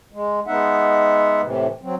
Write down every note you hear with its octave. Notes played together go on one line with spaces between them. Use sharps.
G#3
G#3 B3 D#4 E5 F#5
A2 C3 E3
F#3 C4